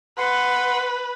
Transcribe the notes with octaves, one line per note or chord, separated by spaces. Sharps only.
B4 F#5 C6